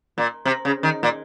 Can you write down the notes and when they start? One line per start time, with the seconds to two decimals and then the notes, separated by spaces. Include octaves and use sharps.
0.18 A#2
0.45 C3
0.65 C#3
0.83 D#3
1.03 A#2